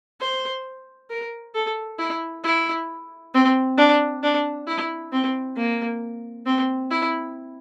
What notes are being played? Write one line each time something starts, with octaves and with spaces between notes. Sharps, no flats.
C5
A#4
A4
E4
E4
C4
D4
D4
E4
C4
A#3
C4
E4